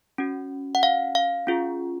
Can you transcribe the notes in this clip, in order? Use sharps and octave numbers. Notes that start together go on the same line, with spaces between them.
C#4 F#4
F#5
F5
F5
C#4 F4 G#4